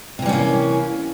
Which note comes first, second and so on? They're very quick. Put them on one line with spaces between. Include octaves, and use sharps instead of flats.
C3 E3 G3 C#4 A#3